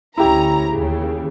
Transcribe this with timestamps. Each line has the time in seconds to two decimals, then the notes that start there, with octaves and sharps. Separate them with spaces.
0.18 D2 C#4 E4 G4 A#5
0.70 D#2 C#3